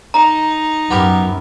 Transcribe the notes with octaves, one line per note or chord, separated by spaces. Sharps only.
D#4 A#5
F#2 B3 G4 A#4